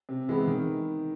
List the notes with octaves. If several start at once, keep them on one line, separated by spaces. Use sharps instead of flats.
C3
E3 G#3 B3
D#3